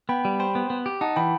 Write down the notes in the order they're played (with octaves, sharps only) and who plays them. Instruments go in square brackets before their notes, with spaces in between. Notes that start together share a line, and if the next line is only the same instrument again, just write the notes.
[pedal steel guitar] B3 [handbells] G5 B5
[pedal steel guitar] G3
[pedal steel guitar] C5 [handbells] G5 B5
[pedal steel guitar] B3
B3
G4
[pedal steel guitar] D#4 [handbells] F#5 A5
[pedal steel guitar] E3 [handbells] G5 B5